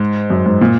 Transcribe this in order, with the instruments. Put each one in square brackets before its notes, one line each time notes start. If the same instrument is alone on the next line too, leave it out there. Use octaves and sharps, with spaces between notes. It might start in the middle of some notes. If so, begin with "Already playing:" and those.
Already playing: [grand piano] G#2
F#2
G#2
A#2